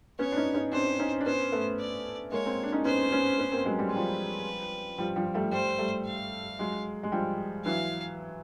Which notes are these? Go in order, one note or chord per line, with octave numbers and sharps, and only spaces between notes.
B3 C#4 C#5
D4
C#4 D#4
C#4 D#4
C4 D4 C5
C#4 D#4
D4
B3 C#4 C5
A3 B3
D5
G#3 A#3 C#5
A#3 C4
D4
C#4 D#4
B3 C#4 C5
B3 C#4
B3 C#4
A#3 C4
F#3 G#3
G3
G#3
F3 G3 B4
F3 G3
F3 G3
G3 A3
G3 A3 C5
G3 A3
F5
F#3 G#3
G#3
F3 G3
E3 F#3 F5